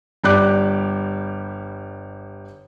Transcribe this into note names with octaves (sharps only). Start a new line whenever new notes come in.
G1 G3 G4 D5 D6 F#6